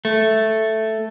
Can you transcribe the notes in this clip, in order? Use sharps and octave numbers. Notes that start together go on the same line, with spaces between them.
A3